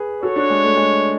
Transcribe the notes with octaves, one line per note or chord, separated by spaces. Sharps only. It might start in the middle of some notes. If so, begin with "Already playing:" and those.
Already playing: G#4 B4
F#4 A4 C#5
D4 F#4
G#3
A3
G#3